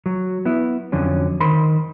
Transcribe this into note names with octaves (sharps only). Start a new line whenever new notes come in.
F#3
B3 E4
F2 D3 F#3 C#4
D#3 C5 B5 C6